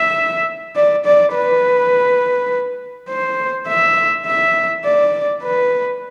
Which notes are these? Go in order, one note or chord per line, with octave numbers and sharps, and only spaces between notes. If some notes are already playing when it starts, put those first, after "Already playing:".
Already playing: E5
D5
D5
B4
C5
E5
E5
D5
B4